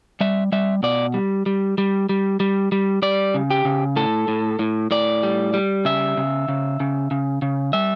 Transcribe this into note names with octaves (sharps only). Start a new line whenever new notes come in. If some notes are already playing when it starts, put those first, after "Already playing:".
G3 E5
G3 E5
B2 D5
G3
G3
G3
G3
G3
G3
G3 D5
C#3
G4
C#3
A2 A4
A2
A2
A2 D5
G3
G3
C#3 E5
C#3
C#3
C#3
C#3
C#3
G3 E5